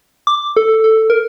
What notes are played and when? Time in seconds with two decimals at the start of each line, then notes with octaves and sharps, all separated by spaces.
0.27 D6
0.57 A4
0.84 A4
1.10 A#4